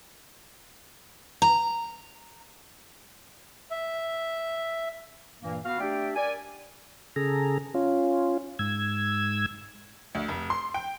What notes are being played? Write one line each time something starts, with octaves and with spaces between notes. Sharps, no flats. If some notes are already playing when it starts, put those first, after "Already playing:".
A#5
E5
G2 A#2 E3 A#3
B3 F#4 F5
A3 D4 G4 D5 E5 G5
A#4 D5 G#5
C#3 G#4 A4 A#5
C#4 F4
G#2 E6 G#6
D2
F1
C6
G5